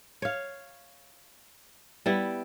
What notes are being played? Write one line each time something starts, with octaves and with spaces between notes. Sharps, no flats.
C#5 F5
G3 B3 E4